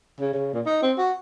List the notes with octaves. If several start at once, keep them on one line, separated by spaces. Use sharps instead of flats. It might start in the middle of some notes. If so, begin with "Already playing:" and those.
C#3
C#3
A#2
D#4
C4
F#4